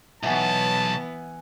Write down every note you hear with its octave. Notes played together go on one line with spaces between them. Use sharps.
B1 E3 B3 E5 F#5 G#5 A5